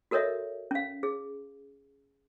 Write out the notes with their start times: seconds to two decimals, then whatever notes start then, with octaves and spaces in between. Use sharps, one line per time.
0.11 F#4 A4 A#4 C#5 D#5 E5
0.71 C#4 F5
1.03 G#4